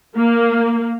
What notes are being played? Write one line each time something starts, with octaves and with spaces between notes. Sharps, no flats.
A#3